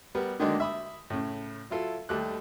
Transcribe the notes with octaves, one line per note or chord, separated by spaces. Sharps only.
G3 B3 A#4
D3 D#3 F#3 G#3 A#3 D4
E5 B5 D#6
A2 C#3
F#3 E4 F4 A4
D#2 G3 A3 D6 F#6